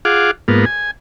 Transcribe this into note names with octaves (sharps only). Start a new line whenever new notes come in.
F4 G#4 F5 F#5 D6
G#2 A#3 B3 F4
G#5